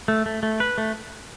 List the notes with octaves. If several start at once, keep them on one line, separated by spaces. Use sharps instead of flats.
A3
A3
A3
B4
A3